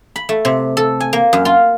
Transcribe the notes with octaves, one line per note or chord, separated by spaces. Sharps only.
B5
A3
C3
A4
G#5
A#3
F#2
F4